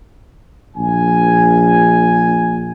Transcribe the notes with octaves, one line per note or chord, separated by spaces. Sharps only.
A#1 G#5